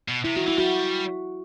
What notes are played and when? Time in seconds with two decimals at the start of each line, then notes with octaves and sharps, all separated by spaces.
0.08 B2
0.24 C3 E4
0.36 D#3 F#4
0.47 E3 E4
0.57 G3 F#4